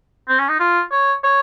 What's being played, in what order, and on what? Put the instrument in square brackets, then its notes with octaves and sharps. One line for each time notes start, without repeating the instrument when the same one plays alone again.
[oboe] C4
C#4
D#4
F4
C#5
C#5